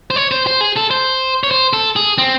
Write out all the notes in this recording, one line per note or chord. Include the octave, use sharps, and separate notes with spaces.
C5
C#5
C5
C5
G#4
A4
C5
C#5
C5
A4
G#4
C4